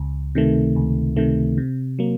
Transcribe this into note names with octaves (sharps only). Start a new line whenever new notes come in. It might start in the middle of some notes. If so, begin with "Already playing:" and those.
Already playing: C#2
C3 D#3 A3
C#2
C3 D#3 A3
C3
F#3 A#3